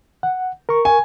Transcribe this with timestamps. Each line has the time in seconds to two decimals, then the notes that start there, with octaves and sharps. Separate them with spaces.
0.23 F#5
0.69 A#4 C#6
0.85 G#5